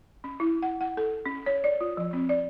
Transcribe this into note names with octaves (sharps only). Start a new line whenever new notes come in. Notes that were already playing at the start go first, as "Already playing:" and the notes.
C#4
E4
F#5
F#5
A4
C#4
C#5
D5
F4
F3
C4
D5